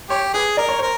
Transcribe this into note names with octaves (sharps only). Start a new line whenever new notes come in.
G4 C#5
G#4 B4
A#4 D5
C#5
A#4 C5